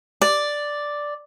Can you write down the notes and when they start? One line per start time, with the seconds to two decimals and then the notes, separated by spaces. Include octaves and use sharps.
0.22 D5